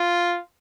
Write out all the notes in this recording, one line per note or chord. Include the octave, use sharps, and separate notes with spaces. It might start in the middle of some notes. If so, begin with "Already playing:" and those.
Already playing: F4